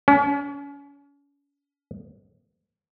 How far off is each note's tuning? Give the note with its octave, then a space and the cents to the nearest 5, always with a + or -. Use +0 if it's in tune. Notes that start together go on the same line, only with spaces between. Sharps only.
C#4 +35